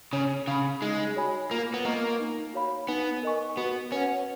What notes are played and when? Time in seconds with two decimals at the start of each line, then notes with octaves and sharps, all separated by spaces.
0.13 C#3 C#5
0.47 C#3 F5 B5
0.82 G#3 D#4
1.16 F#4 C#5 G#5 B5
1.51 A#3 F4
1.74 B3
1.85 A#3 A#4 D#5 A#5 C#6
2.20 D#4
2.53 F#4 C#5 F5 B5
2.88 B3 D#4
3.23 A#4 D#5 G#5 C#6
3.57 B3 F#4
3.92 C#4 B4 F#5